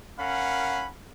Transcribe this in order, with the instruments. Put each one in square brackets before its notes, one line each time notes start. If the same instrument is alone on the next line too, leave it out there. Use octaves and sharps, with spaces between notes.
[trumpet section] C#4 A#4 F5 F#5 B5